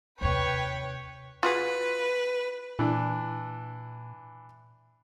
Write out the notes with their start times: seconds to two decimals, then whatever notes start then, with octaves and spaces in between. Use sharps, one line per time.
0.21 D#2 C3 B4 C#5 G5
1.43 F4 F#4 G#4 B4
2.79 A#2 E3 D4